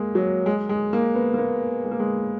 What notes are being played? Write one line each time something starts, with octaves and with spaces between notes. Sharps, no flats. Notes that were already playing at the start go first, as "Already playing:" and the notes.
Already playing: G#3 A#3
F#3
G#3
G#3
A#3
B3
A#3
B3
G#3
A#3
G#3